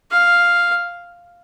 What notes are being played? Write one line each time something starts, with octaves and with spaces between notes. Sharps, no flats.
F5